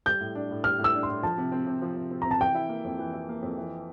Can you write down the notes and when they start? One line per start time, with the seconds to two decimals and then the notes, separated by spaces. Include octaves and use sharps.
0.06 G3 G6
0.21 A2
0.35 D4
0.51 A2
0.64 G3 F6
0.79 A2
0.84 E6
0.94 D4
1.03 C6
1.08 A2
1.23 F3 A5
1.38 C3
1.52 C4
1.67 C3
1.82 F3
1.96 C3
2.11 C4
2.22 C3 A#5
2.31 A5
2.41 E3 G5
2.55 E4
2.69 A#3
2.84 F2
2.99 E3
3.13 E4
3.29 A#3
3.42 F2
3.58 E3